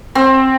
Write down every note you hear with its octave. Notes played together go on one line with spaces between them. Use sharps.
C4